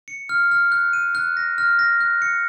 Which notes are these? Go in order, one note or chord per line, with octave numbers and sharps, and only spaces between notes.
C#7
F6
F6
F#6
D#7
F#6
A#6
F6
A#6
F#6
C#7